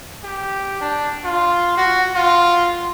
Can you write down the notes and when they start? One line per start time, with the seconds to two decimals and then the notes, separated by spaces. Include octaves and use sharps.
0.24 G4
0.81 D4
1.25 F4
1.77 F#4
2.14 F4